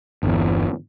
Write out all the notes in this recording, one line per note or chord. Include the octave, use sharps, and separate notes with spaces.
G1 E2